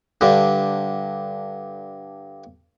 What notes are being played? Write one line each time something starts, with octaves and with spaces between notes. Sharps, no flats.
G2 D3